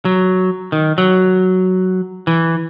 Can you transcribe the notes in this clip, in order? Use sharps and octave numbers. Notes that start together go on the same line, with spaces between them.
F#3
D#3
F#3
E3